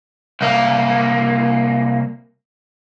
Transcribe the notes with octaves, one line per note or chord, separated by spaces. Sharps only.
C2 A#3